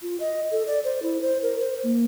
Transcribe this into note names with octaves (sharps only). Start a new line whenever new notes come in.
F4
D#5
A4
D5
C5
E4
C5
A#4
C5
A#3